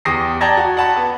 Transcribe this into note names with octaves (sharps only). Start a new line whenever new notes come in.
E2 G4 D6 D#6 A#6 C7
D5 G5 A5 A#5 G#6 A#6
F#4
F#5 A5 B5
B3